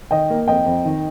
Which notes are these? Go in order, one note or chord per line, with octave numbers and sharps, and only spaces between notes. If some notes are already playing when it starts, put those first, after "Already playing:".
D#3 D#5 G5
A#3
F2 D#5 G5
F2
D#3